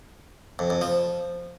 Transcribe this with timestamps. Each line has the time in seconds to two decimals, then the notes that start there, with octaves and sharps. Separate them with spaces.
0.59 F2
0.70 F2
0.81 F3